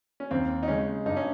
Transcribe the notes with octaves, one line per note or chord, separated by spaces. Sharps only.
C#4
D#2 C4
D#4
C#3 G#3 C#4
G2 D#4
C#4